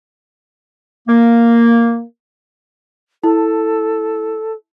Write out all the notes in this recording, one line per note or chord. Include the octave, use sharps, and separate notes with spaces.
A#3
E4 A4